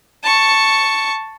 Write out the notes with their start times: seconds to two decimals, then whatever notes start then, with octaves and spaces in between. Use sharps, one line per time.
0.23 A5 C#6